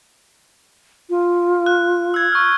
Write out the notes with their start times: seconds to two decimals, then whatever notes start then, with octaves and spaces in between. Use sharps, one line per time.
1.10 F4
1.66 F#6
2.14 E6 G#6
2.32 C#6 F6